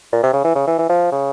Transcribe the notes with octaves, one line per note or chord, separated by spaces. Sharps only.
A#2
C3
C#3
E3
C#3
E3
E3
F3
C#3